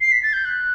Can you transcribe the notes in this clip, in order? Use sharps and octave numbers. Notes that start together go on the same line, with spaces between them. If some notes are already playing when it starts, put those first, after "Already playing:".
C7
B6
A6
G6
F#6